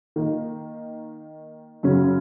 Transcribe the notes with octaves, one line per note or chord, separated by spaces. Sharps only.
D#3 A#3 D#4
F#2 C#3 F#3 C#4